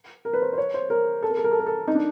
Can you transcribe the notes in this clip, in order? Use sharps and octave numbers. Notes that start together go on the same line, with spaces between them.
A#4
B4
C5
C5
C#5
C5
A#4
A4
A#4
A4
A#4
A4
A#4
A4
D#4
D4